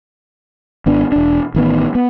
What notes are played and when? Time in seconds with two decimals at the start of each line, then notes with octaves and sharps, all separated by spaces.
0.86 G#1 B3 D4
1.12 E1 D4
1.55 A1 D#3 B3
1.95 B3